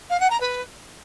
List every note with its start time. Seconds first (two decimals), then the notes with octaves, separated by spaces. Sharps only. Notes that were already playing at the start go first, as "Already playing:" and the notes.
0.10 F5
0.20 F#5
0.30 A#5
0.40 B4